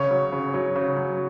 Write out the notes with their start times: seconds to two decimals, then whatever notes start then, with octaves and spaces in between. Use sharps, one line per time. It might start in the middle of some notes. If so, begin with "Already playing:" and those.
Already playing: C#3 C#4 C#5
0.11 F#3
0.32 C#3
0.54 F#3
0.76 C#3
0.97 F#3